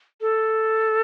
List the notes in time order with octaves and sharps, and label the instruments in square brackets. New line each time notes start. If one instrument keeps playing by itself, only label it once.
[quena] A4